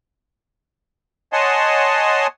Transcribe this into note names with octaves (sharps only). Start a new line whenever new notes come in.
C#5 D#5 F#5 G#5 A5 C6